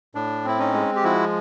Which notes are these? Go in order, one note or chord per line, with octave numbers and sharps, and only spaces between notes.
A2 D4
C4 E4
C#4 D#4
G#3
G4
F3 E4 F#4